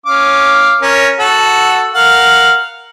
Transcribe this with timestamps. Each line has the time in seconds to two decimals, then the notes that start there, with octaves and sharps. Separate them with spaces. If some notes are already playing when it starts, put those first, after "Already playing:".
0.06 C#4 F5 D6
0.81 C#4 A#4
1.19 F#4 A4 F#5
1.94 A#4 F5 F#5